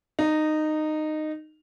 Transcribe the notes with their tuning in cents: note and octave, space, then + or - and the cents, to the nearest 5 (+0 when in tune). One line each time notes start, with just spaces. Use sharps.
D#4 -15